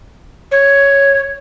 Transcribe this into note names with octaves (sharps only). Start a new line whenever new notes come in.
C#5